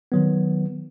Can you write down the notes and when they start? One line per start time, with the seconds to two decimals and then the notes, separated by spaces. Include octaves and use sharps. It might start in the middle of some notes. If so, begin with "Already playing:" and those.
0.12 D#3 F#3 B3